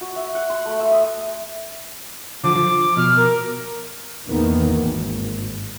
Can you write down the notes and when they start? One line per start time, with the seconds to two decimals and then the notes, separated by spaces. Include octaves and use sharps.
0.01 F#4
0.16 E5
0.35 F#5
0.50 C6
0.65 A3
0.80 E5
0.92 D#6
2.44 D3 F3 D6
2.55 F3
2.97 B2 F6
3.16 A#4
4.27 E2 D#3 E3 A#3 B3
4.69 G#1